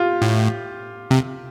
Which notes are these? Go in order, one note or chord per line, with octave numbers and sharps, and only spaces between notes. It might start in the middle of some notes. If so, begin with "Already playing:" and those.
Already playing: F4 G4
A2
C3